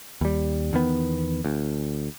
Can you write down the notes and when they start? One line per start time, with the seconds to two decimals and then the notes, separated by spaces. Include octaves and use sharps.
0.21 D#2 G3
0.73 E2 D#3 B3
1.45 D2